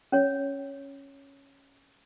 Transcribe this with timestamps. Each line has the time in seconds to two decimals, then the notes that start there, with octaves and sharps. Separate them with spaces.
0.12 C#4 C#5